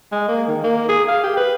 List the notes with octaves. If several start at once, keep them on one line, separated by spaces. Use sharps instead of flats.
G#3
A#3
D#3
A#3
G#4
F5
G4
B4